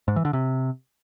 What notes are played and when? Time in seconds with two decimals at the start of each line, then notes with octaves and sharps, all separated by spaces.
0.08 G#2
0.16 E3
0.25 D3
0.33 C3